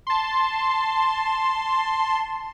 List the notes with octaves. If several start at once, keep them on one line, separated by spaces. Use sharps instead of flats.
A5 C6